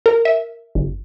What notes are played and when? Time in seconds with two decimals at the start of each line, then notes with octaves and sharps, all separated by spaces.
0.06 A#4
0.25 E5
0.75 G1